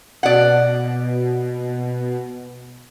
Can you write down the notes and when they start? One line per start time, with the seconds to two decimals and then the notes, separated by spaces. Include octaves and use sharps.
0.23 B2 D5 F#5